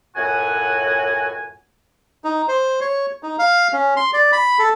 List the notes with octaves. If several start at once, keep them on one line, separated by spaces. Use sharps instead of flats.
C#2 F#2 A2 F#4 F#5 G#5
D#4
C5
C#5
D#4
F5
C#4
C6
D5
B5
A4